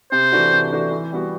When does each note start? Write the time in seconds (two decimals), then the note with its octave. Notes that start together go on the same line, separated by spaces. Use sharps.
0.12 C3 C5
0.32 E3 A3 D4 F#4
0.52 C3
0.72 E3 A3 D4 F#4
0.91 E3
1.12 G3 B3 F#4